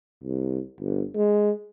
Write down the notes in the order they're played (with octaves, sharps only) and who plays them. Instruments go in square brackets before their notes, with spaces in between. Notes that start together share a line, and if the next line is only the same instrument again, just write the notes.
[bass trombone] C2
G1
G#3